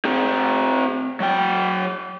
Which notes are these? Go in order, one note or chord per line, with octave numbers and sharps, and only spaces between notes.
C4 G#4
F#3 G5